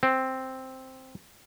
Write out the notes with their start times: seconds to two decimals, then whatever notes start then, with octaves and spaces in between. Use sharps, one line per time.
0.03 C4